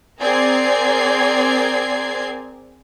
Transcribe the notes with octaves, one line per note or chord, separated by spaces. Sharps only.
C4 G#4 A#4 D5 G#6 C7